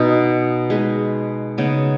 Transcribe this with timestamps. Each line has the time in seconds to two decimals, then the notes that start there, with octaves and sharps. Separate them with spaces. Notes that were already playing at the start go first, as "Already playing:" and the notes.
Already playing: B2 B3 D#4
0.70 G#3 D#4 B4
1.58 C#3 B3 D#4